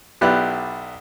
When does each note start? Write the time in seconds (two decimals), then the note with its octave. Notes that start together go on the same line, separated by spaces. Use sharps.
0.21 B1 B3 E4 G4 D5 F#6